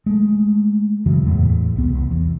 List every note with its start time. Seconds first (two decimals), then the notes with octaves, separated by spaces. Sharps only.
0.06 G#3 A3
1.06 F#2 C#3 E3 F#3
1.23 E2 A2
1.76 C2 B3
1.89 C2
2.11 E2